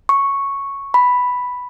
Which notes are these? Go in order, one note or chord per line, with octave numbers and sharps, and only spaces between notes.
C#6
B5